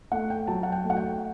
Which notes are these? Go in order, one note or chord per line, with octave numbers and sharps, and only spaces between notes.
A3 F#5
G5
F#3 A5
F#5
G5
A3
F#5
G5